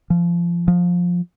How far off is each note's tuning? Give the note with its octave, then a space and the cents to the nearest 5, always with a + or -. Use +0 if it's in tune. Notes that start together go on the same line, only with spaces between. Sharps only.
F3 -25
F3 +15